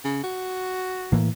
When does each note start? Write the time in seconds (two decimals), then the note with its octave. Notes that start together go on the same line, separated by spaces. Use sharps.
0.04 C#3
0.23 F#4
1.12 A2 E3 A#3